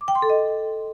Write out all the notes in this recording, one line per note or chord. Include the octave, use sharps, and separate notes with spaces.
D6
G5
C6
A4
D#5